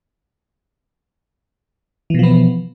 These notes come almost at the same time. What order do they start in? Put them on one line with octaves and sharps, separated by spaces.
E3 B2 F3 B3